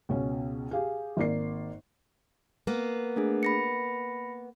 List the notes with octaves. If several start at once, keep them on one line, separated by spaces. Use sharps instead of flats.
C#2 B2 C#4
G4 G#4 F5
G#1 A#3 D5 C7
A#3 B3
A3 D4 G#4
B5 A#6 C#7